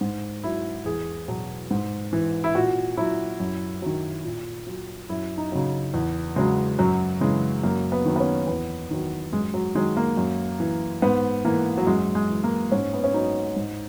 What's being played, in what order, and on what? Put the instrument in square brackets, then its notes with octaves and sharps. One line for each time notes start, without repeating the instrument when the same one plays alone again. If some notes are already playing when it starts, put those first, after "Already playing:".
[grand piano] G#2
F#3 E4
E2 G#4
B2 F#3
G#2
E3
E4
A#2 F#4
F#3 E4
F#2
D#3 F#3
A#2
F#3
F#2 E4
D#4
C#3 F#3
E2
C#3 F#3 G#3
F#2 F#3
C#3 E3 G#3
F#2 A#3
B3
D#3 F#3
B3
C#4
E2 B3
D#3 F#3
F#2 G#3
F#3
D#3 F#3 G#3
A#3
F#2
E3
G#2 B3
E3 A#3
F#3
F#2 G#3
G#3
E3
A#3
G#2 C#4
B3
C#4
F#3 D#4
G#2